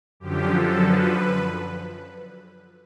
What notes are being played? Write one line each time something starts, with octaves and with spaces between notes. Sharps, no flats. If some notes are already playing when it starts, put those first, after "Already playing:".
F#2 D3 F3 G4
A4
B4